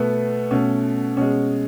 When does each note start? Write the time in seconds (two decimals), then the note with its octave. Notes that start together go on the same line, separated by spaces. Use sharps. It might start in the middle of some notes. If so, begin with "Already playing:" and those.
Already playing: B2 A3 B3
0.51 B2 A3 C#4
1.17 B2 G#3 C#4